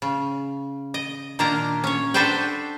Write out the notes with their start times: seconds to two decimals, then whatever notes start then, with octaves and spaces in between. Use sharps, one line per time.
0.02 C#3
0.94 D#5
1.39 A#2 D#3 A#3 D4 F5 A#5
1.84 C#4 C#5
2.14 D4 F#4 A4 B4 C5 G5